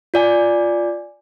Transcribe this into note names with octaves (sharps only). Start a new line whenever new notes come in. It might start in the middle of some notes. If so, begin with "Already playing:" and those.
F4 D5 G#5